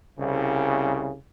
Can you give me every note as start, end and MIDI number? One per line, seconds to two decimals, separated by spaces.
0.18 1.17 36
0.18 1.17 49